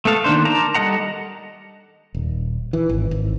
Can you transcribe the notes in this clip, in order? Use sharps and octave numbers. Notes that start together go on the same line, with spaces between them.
A3 B3 A4 F5
D#3 A#3 D4 C5
A#4 A5 A#5 D6
G3 A4 D#5 F#5 A#5
D#1
E3
G#1
G#1